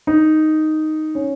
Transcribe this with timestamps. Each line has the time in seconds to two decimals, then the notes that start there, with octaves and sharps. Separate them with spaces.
0.07 D#4
1.15 C#4